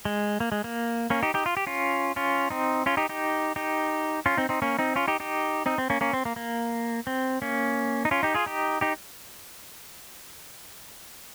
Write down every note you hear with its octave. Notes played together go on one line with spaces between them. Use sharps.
G#3
A#3
G#3
A#3
A#3 C#4
D#4 G4
D#4 G4
F4
G4
C#4 F4
C#4 F4
C4 D#4
C#4 F4
D#4 G4
D#4 G4
D#4 G4
C#4 F4
C4 D#4
C4 D#4
A#3 C#4
C4 D#4
C#4 F4
D#4 G4
D#4 G4
C4 D#4
C4
A#3 C#4
A#3 C#4
C4
A#3
A#3
C4
A#3 C#4
D#4
C#4 F4
D#4 G4
F4 G#4
D#4 G4
D#4 G4